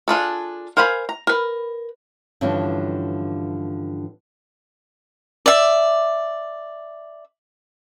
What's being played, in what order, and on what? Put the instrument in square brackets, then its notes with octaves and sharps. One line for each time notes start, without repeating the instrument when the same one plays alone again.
[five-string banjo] D4 F4 G#4 A4
A#4 C5 F5 G#5 B5
A#5
A#4 B4
[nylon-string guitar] G2 D3 E3 F3 C#4 D4
[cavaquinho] D5 E5